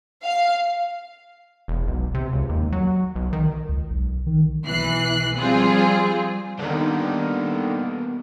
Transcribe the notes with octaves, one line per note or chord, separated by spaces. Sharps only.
F5
E1
B1
C3
C#2
D#2
F#3
B1
D#3
C#2
B1
D#3
B1 E3 F#6 C7
F3 G3 C4 F4 G#4
D3 D#3 G3 A#3 B3